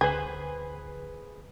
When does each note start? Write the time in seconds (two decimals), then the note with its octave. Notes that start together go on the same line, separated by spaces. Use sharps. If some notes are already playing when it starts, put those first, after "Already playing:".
0.01 D2 G#4 B4 C5 G#5